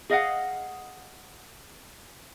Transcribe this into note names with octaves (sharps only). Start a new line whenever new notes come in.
G#4 D#5 F5 F#5